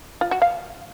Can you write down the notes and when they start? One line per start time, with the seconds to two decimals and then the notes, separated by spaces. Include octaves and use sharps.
0.21 F4
0.31 F#4
0.42 F5